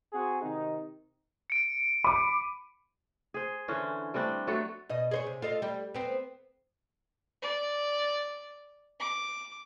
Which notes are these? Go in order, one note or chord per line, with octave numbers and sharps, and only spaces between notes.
C4 F#4 G#4
C3 D#3 D#4
C#7 D7
B5 D6 D#7
G#4 C5
D3 E3 C#4 C5
G3 A3 C4 D4
F#3 A3 B3 A4
B2 D#5
G#4 C5 C#5
C3
F4 A4 D#5
G3
B3 C4
D5
D6